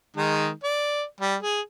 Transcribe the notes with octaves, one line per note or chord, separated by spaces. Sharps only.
D#3 G#3 D#4
D5
G3
G#4